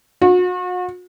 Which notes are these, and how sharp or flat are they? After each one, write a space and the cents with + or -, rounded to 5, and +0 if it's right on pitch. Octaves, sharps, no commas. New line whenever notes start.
F#4 -40